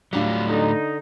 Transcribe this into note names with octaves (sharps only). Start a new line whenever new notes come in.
A2 F#3 G3 D4 F4
D3 D#4